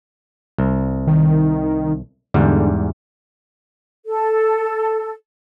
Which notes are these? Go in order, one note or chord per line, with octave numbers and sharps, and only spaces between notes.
C2
D#3
E2 G#2 D3 G3
A4